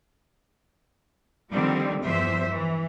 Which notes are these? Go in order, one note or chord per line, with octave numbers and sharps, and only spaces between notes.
D3 D#3 F3 G3 A#3 C4
E2 G2 E3 F3 C5 E5
E3